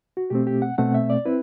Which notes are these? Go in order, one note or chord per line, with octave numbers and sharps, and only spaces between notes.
F#4
B2 A3 C4 G4
G4
F#5
B2 A3 C4 F#5
E5
D5
C4 E4 B4